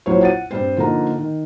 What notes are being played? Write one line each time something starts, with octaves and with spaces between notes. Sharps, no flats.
A#1 F#3 E4 C5 C#5
F#5 A6 D#7
G2 C4 C5
D3 F3 A#3 D#4 A#5
D#3